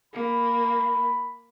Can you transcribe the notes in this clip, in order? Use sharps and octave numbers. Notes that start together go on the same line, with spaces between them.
A#3 B5